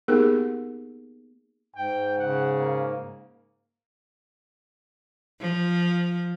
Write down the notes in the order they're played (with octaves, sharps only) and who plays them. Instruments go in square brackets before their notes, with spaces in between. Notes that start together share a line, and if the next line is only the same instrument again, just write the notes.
[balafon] A#3 B3 D#4 G4 G#4 A#4
[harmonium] G#2 [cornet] G5
[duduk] C#3 [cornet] F#5
[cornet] A#3
[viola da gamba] F3